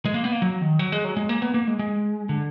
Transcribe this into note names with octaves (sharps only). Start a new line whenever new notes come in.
G#3
A#3
B3
A#3
F#3
D#3
F#3
G#3
F#3
G#3
A#3
B3
A#3
G#3
G#3
D3